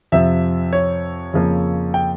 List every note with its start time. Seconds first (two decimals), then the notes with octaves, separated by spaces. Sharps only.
0.12 F2 C3 F3 E5
0.73 C#5
1.33 F2 C#3 F3 A#3
1.94 G5